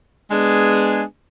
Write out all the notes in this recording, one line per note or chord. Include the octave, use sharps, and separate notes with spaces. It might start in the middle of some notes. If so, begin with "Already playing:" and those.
G#3 B3 D4 G#4